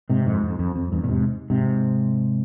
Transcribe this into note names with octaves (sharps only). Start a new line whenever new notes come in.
G#2 C3
F2 G#2
F2
F2
F2
E2 G2
A#2
G#2 C3
G#2 C3